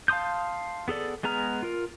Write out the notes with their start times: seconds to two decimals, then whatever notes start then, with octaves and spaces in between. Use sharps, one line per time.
0.08 F5 A5 C6 D#6 G6
0.88 B3 G#4 A4 D5
1.23 G#3 B3 G#4 A#5 F6
1.63 F4 A#4